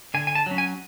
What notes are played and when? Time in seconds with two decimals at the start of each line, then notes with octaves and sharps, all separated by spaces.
0.14 D3 G#5
0.27 G#5
0.35 A5
0.46 F#3 C#4
0.58 G#5